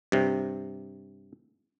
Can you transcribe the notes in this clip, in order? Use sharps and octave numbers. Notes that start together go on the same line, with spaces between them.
G2 C3